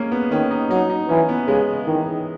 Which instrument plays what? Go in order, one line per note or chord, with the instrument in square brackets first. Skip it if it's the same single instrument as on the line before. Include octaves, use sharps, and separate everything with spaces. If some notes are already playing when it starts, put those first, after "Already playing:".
Already playing: [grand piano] G#3 A#3 C#4
B3
[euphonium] D#3 [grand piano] C#4
[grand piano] D#4
[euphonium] F#3 [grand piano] D#4
[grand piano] D#4
[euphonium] E3 [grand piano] C#4
[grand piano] B3
[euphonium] C#3 [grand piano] G#3
[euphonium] D#3 [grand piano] E3